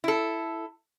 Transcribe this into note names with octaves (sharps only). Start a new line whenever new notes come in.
E4 A4